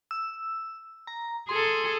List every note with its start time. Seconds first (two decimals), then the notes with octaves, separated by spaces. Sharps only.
0.11 E6
1.07 A#5
1.49 G#4 A4 C6